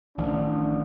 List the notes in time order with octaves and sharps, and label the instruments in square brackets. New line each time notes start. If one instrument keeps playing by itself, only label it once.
[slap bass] A1 D#3 F3 [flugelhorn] D4